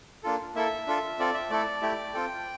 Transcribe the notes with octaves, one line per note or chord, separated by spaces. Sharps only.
A#3 D4 F4 A4
A#3 E4 A4 E5
D4 F4 A4
C4 F4 A4 D5
E5
A3 E4 A4 D5
A3 E4 G4
C4 F4 A4 G5